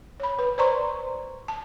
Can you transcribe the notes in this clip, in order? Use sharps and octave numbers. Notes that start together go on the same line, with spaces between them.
C#5 B5
B4
C5 D5 A#5 C6 C#6
A5